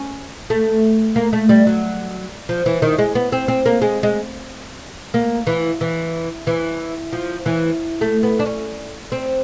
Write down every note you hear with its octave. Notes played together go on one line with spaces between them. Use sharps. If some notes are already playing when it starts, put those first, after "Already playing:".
Already playing: C#4
A3
A#3
A3
G3
F#3
F3
E3
D#3
G#3
B3
C4
C4
A#3
G#3
G#3
A#3
E3
E3
E3
F3
E3
A3
B3
D4
C#4
C4